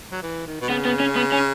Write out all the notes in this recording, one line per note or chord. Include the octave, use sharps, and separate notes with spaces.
F#3
E3
D#3
B2
C#3 B3
B3
C#4
B3
C#4